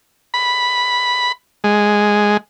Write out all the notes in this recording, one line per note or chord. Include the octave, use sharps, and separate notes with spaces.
B5
G#3